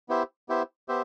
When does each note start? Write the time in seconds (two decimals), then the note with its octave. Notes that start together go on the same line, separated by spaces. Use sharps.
0.09 B3 E4 G4 C5 E5
0.49 B3 E4 G4 C5 E5
0.88 B3 G4 C5 E5